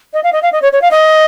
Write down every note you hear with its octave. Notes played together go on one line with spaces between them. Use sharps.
D#5
F5
D#5
F5
D#5
C#5
C#5
F5
D#5